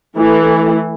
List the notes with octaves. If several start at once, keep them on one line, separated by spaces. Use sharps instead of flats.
E3 A3